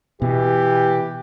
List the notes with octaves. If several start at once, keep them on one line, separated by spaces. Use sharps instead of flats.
B2 E3 G4